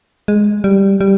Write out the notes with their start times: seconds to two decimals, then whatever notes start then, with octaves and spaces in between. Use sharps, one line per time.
0.28 G#3
0.64 G3
1.01 G3